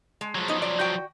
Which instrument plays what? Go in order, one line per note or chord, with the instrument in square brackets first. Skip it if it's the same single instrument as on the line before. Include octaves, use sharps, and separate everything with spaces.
[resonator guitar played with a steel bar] G#3
[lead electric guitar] F3 F#3
[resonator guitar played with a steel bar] B3 D#4
D5
F#4 G5